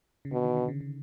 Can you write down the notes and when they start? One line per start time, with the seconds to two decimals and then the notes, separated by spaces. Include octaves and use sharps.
0.25 C#3
0.32 B2 D3
0.44 D#3
0.57 D3
0.68 C#3
0.81 C#3